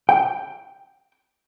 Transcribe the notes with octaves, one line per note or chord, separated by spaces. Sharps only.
G5